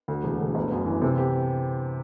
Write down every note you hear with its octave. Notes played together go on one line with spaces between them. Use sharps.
D2
E1
D2
G1
F#2
E3
C3 A4
G4